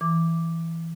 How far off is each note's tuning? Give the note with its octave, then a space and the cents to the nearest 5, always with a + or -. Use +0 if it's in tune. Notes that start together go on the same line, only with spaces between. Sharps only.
E3 +0 D6 +0